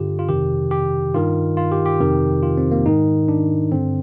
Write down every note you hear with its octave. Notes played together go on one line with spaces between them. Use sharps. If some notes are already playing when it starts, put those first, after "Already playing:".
Already playing: G2 D3 F4 G4
F4
F2 C3 D#3 G4
G4
G2 D#3 F4
F4
G4
G4
F2 C3 D#3
F4
C4
A#3
G#2 D#3 D#4
D4
G2 D3 C4